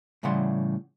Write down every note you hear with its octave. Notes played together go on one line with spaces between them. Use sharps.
A2 C#3 E3 G3 F#5 C6